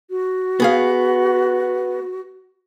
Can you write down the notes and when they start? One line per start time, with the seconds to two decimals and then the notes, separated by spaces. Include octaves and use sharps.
0.10 F#4
0.60 B3 G#4 F5